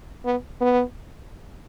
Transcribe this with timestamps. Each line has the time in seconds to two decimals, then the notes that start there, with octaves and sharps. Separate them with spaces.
0.25 B3
0.61 B3